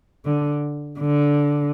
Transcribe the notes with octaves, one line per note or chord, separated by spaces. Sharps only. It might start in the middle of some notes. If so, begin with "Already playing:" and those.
D3
D3